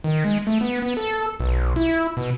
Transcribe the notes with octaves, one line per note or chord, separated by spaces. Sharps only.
D#3
G#3
A3
B3
B3
A4
B1
E4
B2